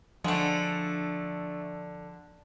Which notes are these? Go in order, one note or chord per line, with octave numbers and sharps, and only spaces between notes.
D3 F3 G#3 A3